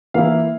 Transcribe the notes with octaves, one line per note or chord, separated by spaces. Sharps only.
E3 A#3 E4 F5